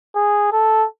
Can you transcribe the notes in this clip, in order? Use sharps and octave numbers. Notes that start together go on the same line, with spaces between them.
G#4
A4